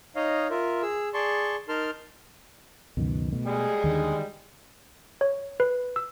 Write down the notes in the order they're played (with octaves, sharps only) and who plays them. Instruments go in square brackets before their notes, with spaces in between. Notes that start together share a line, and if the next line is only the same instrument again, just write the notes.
[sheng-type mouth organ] D#4 C#5 D#5 F5
F4 A#4 E5
G#4 E6
G#4 D5 A5 C6 C#6
D#4 A#4 A5 C6 F6
[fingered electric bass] C#2 F#2 D#3 [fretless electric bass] B2
[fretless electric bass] B2 [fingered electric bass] A3
[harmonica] G3 G#3 G#4
[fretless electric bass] D#2 D3 [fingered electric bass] D#3
[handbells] C#5
B4
E6